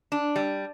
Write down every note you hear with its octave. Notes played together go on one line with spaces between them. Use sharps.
D4
G3